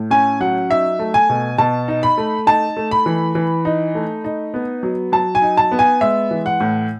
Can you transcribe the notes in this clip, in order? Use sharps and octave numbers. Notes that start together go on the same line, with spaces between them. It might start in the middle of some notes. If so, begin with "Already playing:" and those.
Already playing: A2
C#4 G#5
F#3 F#5
D#4 E5
A3
G#5
B2
B2 A5
D#4
B5
A3
D#4 A5
A3
B5
E3
E3
D#4
A3
D#4
B3
F#3
F#3 A5
G#5
D#4
A5
B3
G#5
G#3 E5
E3
F#5
A2